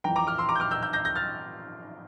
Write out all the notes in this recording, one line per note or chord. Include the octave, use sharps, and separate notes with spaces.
F2 E3 G5 A#5
A#5 D6
D6 F6
C6 E6
A#5 D6
G6
D6 F6
E6 G6
E6 G6
G6 A#6
G6 A#6
F6 A6